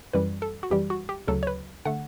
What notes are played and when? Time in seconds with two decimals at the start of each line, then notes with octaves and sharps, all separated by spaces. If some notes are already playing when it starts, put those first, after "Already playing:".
0.13 F#2 E3 G3 B4
0.42 A4
0.63 F#4
0.71 F#2 E3 G3 G4
0.90 F#4
1.09 G4
1.27 D2 C#3 F#3 A4
1.43 C#5
1.47 B4
1.85 D3 A3 F#5